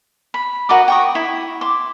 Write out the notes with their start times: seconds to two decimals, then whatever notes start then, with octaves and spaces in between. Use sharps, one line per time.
0.34 B5
0.69 F#4 A#4 D#5 D6
0.88 G5 C#6 D#6
1.15 E4
1.61 C6 D6